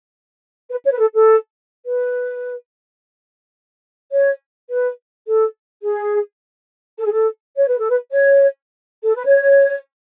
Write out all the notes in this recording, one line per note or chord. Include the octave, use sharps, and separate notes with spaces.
B4
C#5
B4
A4
A4
B4
C#5
B4
A4
G#4
A4
G#4
A4
C#5
B4
A4
B4
C#5
A4
B4
C#5